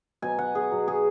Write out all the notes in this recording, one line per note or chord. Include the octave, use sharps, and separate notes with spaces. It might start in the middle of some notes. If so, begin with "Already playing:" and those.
B2 F#3 G#5
F#5
G#4
B2 F#3
G#4